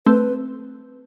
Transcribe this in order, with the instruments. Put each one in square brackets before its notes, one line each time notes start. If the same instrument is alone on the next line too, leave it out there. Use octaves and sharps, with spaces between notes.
[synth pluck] A3 C4 [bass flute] B4